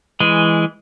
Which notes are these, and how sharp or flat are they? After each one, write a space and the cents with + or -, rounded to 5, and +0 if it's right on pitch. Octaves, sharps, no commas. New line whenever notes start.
E3 +0 G#3 +0